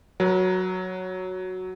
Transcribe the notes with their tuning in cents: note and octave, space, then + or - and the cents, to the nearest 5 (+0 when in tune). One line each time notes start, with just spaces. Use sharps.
F#3 +0 B4 -45